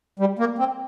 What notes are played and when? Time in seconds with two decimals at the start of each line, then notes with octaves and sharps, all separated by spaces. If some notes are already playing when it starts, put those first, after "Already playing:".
0.19 G3
0.39 A#3
0.58 C4